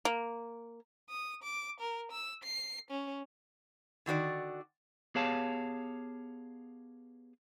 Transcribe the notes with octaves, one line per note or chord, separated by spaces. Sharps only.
A#3
D#6
D6
A#4
E6
C7
C#4
D3 D#3 F#4 D5
B3 G4 G#4 C#5 F5 A5